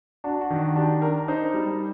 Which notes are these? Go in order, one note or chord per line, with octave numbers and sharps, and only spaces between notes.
D4 F#4
F#4
D#3
F#4
D4 G4
D4 A#4
D#4 C5
G3